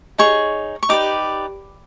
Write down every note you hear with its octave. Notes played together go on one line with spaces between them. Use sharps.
D#4 G#4 C#5 C#6
C#6
D#4 G4 B4 D5 D6